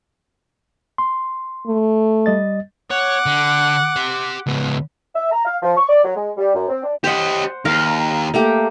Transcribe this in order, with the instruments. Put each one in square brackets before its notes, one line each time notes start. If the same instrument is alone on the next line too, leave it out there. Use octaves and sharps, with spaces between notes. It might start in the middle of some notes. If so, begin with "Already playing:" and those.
[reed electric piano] C6
[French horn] A3
[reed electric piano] G3 D#5 A6
[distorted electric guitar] C#5 [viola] F#5 D6
[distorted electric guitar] D3
G4 C6
C#2 B3
[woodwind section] E5
A#5
F5
F3
C#6
D5
F#3
G#3
G3
F#2
C4
D4
[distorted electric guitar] G4 D#5 [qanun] C5 F#5
[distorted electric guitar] D#2 [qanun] A#4 F5
[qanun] A3 A#3 G4